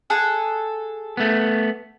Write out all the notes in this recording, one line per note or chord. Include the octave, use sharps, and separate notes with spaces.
G#4 A4 F#5
A3 B3